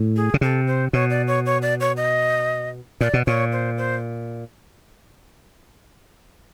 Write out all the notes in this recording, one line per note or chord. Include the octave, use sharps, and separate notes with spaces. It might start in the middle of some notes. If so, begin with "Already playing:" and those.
Already playing: A2
G#4
C#3
C3 A4
C5
B2 C#5
D5
C#5
C#5
D5
C#5
D#5
A#2 D5
B2
A#2 C#5
C5
C5